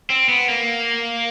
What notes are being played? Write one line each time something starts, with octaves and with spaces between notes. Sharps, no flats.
C4
B3
A#3